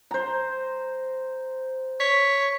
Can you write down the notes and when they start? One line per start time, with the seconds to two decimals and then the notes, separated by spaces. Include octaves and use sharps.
0.11 C5 A#5
2.00 C#5 B6